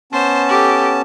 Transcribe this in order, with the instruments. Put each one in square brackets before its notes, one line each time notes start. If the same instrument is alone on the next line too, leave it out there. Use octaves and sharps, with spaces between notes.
[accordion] B3 C#4 A5 [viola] C5
[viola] G4 A4